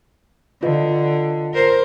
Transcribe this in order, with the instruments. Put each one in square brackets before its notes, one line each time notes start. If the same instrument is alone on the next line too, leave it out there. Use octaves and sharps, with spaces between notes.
[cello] D3 [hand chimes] F4 B4 D#5
[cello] A#4 C5